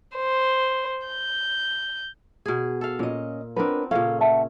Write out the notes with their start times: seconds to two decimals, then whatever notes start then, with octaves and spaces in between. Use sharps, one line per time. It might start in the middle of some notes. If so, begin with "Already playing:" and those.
0.16 C5
1.07 G6
2.46 B2 G#4
2.81 A4 F5
2.99 A#2 C#4 D#5
3.56 B3 C4 D4 A#4 B4
3.91 A#2 C#3 C#4 A4 F5
4.21 E5 F#5 A5